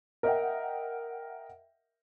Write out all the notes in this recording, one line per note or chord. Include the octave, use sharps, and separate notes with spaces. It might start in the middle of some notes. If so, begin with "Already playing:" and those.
A#4 D#5 E5 F#5 G5